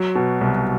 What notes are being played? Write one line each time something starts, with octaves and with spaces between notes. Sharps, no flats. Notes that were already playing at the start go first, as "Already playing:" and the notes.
Already playing: F#3
B2
C2